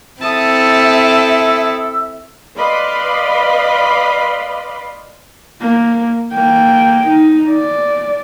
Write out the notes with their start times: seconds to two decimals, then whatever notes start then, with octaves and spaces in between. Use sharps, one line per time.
0.21 C4 E4 A4 E5 A5 D#6 E6
2.56 B4 D5 D#5 F5 B5 C6
5.62 A#3
6.33 A#3 G5
7.07 D#4
7.50 D5